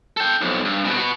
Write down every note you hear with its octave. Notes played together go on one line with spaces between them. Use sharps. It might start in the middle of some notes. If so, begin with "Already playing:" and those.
A4 G5
B1 F2
G2
C2 B2
F#4 B4